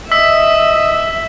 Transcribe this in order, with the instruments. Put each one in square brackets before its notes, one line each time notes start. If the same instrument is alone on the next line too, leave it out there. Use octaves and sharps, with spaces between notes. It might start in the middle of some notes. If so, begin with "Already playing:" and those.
[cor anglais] D#5 [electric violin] E5 [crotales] E6 B6